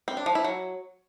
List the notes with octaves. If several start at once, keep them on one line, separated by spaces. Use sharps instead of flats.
C4
D4
F3
E4
F#3